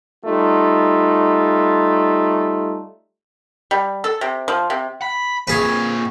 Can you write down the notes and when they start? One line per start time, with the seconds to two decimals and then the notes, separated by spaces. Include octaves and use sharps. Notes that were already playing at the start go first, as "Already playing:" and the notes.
0.25 G3 A3 D#4 F4
3.71 G3
4.04 A4
4.21 C3
4.48 F3
4.70 C3
5.02 B5
5.47 A#2 G#4 B4 C#5